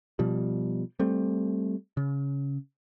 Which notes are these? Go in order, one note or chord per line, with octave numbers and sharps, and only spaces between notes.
B2 F3 G3
G3 A3 C4
C#3